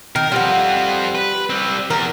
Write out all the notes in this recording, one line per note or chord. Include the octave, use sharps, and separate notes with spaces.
D#3 A#4
G3 B3 C4 F4
B4
G3 C4
E2 A#4